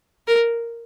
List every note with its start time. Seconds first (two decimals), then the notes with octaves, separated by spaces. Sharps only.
0.28 A#4